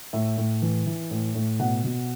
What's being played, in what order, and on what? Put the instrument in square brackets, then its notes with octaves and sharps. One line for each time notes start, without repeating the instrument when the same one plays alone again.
[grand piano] A2 E5
A2
E3
E3
A2
A2
B2 F#5
B2